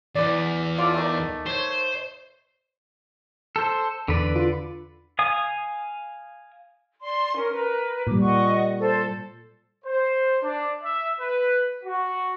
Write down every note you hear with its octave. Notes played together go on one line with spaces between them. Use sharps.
E2 B4 D5
F4 A4 D5
D#3 A3
C5 C#5 D#5 C#6
A4 C5
E2 D3 B4 D5
F4
F5 G#5 D#6
D5 C6
C#4 A#4
A#4 B4
A#2 G3 D6
D#5 F#5 C#6
A4 C5
C5
D4
E5
B4
F#4